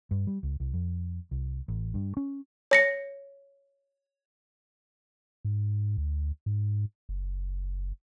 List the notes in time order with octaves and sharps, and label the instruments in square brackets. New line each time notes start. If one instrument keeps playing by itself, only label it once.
[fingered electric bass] G2
G3
C#2
C2
F2
C2
A1
G2
C#4
[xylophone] C#5 A#6 C#7
[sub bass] G#2
D2
G#2
F#1